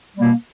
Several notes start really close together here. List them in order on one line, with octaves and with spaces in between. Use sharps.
G3 A#3 B2